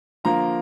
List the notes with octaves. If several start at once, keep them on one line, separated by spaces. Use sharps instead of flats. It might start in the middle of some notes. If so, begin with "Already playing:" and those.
D3 F3 A#3 A#5